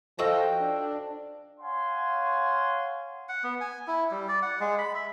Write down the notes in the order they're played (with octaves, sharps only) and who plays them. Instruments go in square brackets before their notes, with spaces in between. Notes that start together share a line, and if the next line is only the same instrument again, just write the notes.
[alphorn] F3 [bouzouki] F#4 D#5 G5 [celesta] A4 [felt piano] C5 F5 E6
[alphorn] D4
[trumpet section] C#5 F5 F#5 G#5 C6
[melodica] F#5
B3
G#5
E4
G3
D5
F#5
G#3
B5
E5